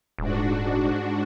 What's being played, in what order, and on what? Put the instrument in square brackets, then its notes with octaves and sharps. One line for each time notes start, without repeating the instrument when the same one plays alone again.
[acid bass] D#1 [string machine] G#2 D4 F#4